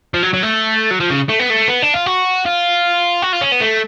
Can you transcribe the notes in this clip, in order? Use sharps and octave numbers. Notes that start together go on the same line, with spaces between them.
F3
F#3
F#3
A3
F#3
F3
C#3
A3
B3
A3
B3
D4
F4
F#4
F4
F#4
F4
C#4
B3
A3